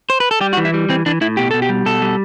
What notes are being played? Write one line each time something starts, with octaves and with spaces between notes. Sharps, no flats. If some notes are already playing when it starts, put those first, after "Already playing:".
C5
B4
A4
G3 G4
F#4
E3
E4
G3
E3 C4
E3 D4
A2 E4
B2 G4
B2 A4
G4
G3
B2 A4
G3